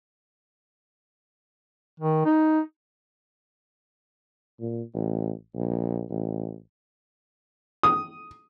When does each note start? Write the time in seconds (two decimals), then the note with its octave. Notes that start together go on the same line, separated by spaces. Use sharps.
2.00 D#3
2.25 D#4
4.60 A#2
4.94 A1
5.55 A#1
6.10 A1
7.83 D#6